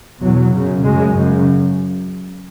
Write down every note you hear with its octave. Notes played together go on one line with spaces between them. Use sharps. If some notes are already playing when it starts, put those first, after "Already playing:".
E2 B2 F#3
F#2 C#3
F#2 C#3 G#3
F#2 C#3